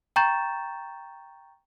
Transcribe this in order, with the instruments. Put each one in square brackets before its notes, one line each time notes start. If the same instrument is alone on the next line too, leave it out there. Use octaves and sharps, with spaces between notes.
[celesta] G5 A#5 C#6 G6 A6 E7